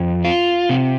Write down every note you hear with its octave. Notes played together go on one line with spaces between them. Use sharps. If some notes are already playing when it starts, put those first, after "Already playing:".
Already playing: F2
F4
C3